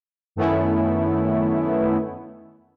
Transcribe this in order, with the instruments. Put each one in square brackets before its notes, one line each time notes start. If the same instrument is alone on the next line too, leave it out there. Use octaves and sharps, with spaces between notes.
[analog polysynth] F#2 D#3 A3 B3 C#4 E4